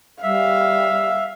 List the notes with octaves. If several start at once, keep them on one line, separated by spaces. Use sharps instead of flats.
G3 E5 F5